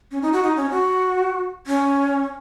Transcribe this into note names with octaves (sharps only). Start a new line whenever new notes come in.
C#4
D#4
F#4
D#4
C#4
F#4
C#4